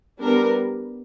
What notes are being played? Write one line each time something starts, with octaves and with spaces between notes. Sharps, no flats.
G3 B3 D4 A#4